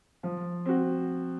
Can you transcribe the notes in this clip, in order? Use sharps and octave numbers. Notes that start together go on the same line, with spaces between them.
F3
C4 F#4